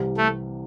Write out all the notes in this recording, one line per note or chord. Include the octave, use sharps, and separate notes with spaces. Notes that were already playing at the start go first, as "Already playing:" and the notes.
Already playing: C2 C3 E3 G3
A3